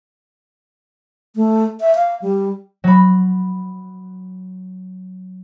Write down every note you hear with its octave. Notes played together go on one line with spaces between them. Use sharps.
A3
E5
F5
G3
F#3 B5